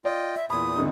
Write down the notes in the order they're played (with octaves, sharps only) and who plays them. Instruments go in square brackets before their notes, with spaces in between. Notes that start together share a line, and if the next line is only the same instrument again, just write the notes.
[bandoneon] F4 D#5 G5 [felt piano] D5
[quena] E5
[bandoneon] E2 A#2 [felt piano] E4 B5 [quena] D#6
[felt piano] G#1 D3 D#4